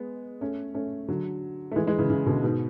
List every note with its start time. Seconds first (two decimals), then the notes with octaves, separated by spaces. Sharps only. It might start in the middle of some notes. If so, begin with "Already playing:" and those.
Already playing: G#3 B3
0.41 A3 C#4
0.74 A3 C#4
1.08 D3 F#3
1.71 A3
1.76 E3 G#3
1.87 E3 G#3
1.98 C#3 E3
2.10 C#3 E3
2.26 B2 D3
2.43 G#2 B2